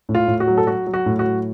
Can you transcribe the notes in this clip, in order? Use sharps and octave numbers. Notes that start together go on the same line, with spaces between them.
A2
F4
A2
F#4
F#3
A4
F#3 F#4
F#3
F#4
A2
F#4
F#3